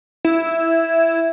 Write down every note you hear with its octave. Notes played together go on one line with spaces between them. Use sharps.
E4